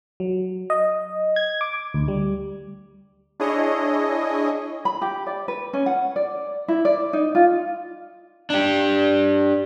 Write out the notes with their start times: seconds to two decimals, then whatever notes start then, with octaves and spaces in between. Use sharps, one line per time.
0.20 F#3
0.70 D#5
1.36 G#6
1.61 D6
1.94 D2
2.08 G3
3.40 D4 E4 G#4 C#5 D#5
4.85 B5
5.02 G4
5.27 D5
5.48 B4
5.73 C#4
5.86 F#5
6.16 D5
6.68 E4
6.85 D5
7.13 D#4
7.35 F4
8.50 D4 G4